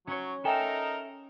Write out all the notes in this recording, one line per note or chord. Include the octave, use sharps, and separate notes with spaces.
F#3 C#4 C#5
D#4 A4 A#4 E5 G5 G#5